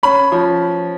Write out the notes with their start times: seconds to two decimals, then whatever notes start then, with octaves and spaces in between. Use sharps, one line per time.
0.03 C#4 B5
0.32 F3